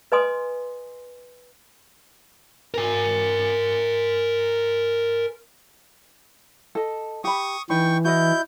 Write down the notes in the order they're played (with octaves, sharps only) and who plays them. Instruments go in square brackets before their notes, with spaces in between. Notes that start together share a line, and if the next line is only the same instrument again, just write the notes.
[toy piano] B4 D#5 G#5 C6 D#6
[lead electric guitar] A#4 G#5
[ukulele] A4 D#5
[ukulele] G4 B5 [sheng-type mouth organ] C#6 D#6
[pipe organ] E3 [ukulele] D#4 B4 [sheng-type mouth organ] G5 C#6
[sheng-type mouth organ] E4 G6 [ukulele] F#4 D#5